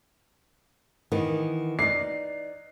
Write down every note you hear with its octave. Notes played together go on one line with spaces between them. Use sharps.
D#3 E3 B3
D#4 D5 C7